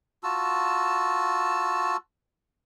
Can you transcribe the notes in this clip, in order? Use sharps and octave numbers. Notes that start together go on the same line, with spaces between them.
F4 F#4 A5 E6